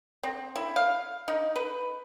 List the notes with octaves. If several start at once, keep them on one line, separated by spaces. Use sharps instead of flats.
C4
E4
F5
D#4
B4